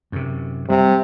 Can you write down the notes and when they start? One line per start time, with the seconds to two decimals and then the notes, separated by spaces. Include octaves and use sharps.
0.12 F#2 C3
0.70 C3 G3